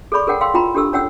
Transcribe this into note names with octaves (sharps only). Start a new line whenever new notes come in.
G#4 A4 D5 B5 C#6
G#4 A#4 C#5 F#5 G5
F5 G5 C6 E6
E4 F4 G5 A#5 B5
D4 G4 A4 E6
C#4 C#5 F#5 G5 E6